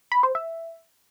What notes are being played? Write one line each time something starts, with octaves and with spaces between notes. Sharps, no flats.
B5
C5
E5